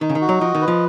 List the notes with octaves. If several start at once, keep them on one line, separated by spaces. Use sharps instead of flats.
D#3 D#4
C#3
D#3
F#4
F#3
F3 D#5
D#3
B4
F3